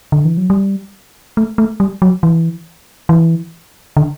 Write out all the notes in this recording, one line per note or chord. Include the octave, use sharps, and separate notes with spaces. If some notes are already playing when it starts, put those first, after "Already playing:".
D3
E3
F#3
G3
A3
A3
G3
F#3
E3
E3
D3